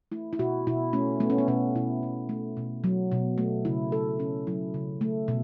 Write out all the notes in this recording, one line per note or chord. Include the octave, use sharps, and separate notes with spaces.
A3 E4
E4
B2 F#4
B2 E4
A3 C#4
A3 B3
C#4
B3
B2 C#4
B2 E4
B2
A3
B2
F#3
B2
A3
C#3 E4
A3 A4
C#3 C#4
F#3 E4
C#3
A3
B2